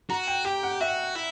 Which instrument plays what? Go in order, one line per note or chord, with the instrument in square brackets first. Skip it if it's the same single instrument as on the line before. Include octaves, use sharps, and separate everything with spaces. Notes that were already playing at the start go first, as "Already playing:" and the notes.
[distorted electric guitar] F#4 [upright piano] A#5
[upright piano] G5
[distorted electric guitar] G4 [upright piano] G5
[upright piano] F#5
[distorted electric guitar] F#4 [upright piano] E5
[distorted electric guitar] E4